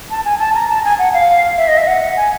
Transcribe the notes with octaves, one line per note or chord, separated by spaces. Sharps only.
A5
G#5
A5
A#5
A5
G#5
F#5
F5
E5
D#5
E5
F#5
G#5